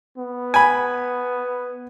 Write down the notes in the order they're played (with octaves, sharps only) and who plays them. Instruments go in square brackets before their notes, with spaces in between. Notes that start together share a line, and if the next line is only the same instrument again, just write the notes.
[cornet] B3
[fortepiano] G#5 B5